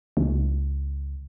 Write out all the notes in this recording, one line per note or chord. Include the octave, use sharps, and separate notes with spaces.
C#2